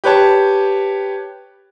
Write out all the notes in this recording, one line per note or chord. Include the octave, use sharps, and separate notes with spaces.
G4 B4 C#5 A5